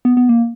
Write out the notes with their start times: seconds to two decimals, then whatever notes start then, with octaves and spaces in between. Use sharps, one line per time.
0.05 B3
0.17 B3
0.29 A#3